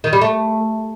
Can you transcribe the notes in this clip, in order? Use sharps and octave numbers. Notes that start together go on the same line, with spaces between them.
D#3
G3
A3